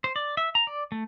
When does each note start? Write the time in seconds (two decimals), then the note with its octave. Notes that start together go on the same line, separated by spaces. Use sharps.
0.04 C5
0.16 D5
0.37 E5
0.55 A#5
0.67 D5
0.92 A3